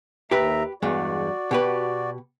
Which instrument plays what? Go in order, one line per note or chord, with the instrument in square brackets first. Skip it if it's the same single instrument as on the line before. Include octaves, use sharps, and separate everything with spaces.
[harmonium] D#2 E5 A#5 [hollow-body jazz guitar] G4 B4
[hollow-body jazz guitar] E2 G2 G#3 [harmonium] F#4 D5
[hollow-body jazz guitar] B2 G4 B4